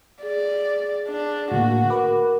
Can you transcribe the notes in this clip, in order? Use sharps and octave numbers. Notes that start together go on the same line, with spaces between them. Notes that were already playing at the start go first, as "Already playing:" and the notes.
G#4 D5
D4
A2 D3 A#3 F#4
A#4 B4 D6